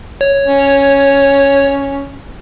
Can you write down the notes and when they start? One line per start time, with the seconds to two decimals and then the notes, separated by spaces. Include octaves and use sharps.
0.21 C#5
0.45 C#4